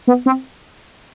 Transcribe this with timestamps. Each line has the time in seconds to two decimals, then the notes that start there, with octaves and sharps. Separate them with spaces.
0.07 B3
0.26 C4